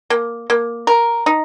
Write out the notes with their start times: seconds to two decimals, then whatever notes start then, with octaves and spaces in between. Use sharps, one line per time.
0.10 A#3
0.50 A#3
0.87 A#4
1.26 D#4